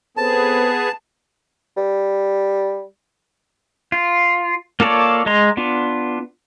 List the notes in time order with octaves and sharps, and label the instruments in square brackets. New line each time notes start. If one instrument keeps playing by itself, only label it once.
[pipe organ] B3 G#4 [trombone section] C4 A4 B4 [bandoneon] A5
[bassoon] G3
[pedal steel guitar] F4
A#3 F4 A4 C#5 D5
G#3 D#5 A#5 C6
B3 D4 F4